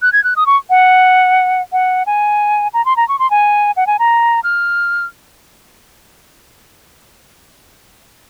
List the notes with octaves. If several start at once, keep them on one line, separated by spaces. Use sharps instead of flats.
F#6
G#6
F#6
D#6
C#6
F#5
F#5
G#5
A#5
C6
A#5
C#6
C6
G#5
F#5
G#5
A#5
F6